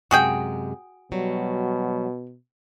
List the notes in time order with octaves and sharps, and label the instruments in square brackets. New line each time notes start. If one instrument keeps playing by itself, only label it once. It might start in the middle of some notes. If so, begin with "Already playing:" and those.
[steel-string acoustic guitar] F#2 C3 G#3 [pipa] F#4 G#4 G5
[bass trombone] B2 [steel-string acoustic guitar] F#3 G3